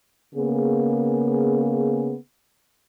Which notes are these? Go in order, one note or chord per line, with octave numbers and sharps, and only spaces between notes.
C#3 A#3 B3 G#4